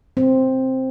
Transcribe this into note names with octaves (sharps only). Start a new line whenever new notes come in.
C4